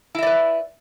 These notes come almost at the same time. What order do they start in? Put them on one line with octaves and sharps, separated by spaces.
E4 E5 D5 B4